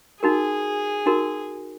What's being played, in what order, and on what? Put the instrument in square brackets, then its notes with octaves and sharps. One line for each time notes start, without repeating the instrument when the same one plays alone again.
[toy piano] D#4 F#4 A#4 [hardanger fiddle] G#4
[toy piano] D#4 F#4 A#4